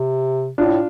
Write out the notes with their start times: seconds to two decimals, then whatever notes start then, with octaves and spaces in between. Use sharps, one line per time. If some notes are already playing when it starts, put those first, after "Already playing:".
Already playing: C3
0.58 A2 D4 F4